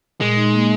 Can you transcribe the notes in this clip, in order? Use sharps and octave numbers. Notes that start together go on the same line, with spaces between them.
A#2 G#3
D#4
A#3